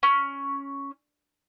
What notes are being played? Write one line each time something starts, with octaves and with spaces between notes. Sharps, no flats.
C#4